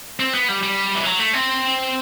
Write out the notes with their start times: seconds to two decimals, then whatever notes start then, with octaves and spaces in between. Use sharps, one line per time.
0.20 C4
0.34 B3
0.49 G3
0.63 G3
0.95 E3
1.06 F#3
1.19 A3
1.34 C4